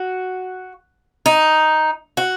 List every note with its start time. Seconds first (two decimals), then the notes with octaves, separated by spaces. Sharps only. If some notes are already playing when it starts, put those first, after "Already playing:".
Already playing: F#4
1.26 D#4
2.17 F#4